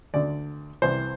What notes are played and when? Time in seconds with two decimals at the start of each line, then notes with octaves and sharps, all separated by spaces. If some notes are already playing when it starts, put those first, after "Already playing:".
0.14 D2 D3 D5
0.82 C2 C3 E3 C5